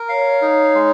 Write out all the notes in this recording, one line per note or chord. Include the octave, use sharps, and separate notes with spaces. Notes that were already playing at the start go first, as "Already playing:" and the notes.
Already playing: A#4
C#5 F5
D#4
G#3